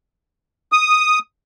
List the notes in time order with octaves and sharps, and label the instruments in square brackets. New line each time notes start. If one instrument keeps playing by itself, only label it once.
[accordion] D#6